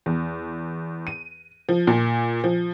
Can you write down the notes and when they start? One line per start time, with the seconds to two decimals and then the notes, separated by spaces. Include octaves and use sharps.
0.06 E2
1.07 D#7
1.69 F3
1.87 A#2
2.44 F3